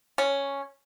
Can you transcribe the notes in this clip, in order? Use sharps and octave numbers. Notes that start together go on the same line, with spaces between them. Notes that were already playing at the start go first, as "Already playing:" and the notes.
C#4